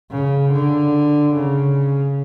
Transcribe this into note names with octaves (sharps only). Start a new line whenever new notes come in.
C#3
D3
C#3